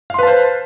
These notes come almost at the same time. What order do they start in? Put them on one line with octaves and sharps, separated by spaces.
F5 C6 B4 A5 C5